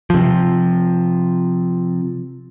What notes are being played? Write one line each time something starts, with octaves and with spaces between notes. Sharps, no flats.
C3 F3